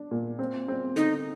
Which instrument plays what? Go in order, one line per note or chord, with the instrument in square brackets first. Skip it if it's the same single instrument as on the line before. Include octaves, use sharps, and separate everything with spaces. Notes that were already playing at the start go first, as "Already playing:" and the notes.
Already playing: [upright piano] D4
A#2
C4
C4
[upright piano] D3 [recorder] D#4